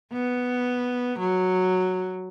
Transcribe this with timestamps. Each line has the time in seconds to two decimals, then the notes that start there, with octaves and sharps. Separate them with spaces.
0.13 B3
1.19 F#3